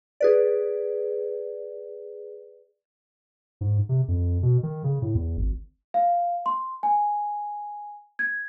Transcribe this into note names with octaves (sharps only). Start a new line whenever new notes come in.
G#4 B4 D5
G#2
C3
F2
B2
D#3
C#3
A2
E2
G#1
F5
C6
G#5
G#6